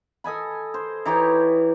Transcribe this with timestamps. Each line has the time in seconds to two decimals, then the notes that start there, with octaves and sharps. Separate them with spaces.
0.24 A4 D#5 G#5 B5
0.74 C5
1.05 E3 D#4 G4 C#5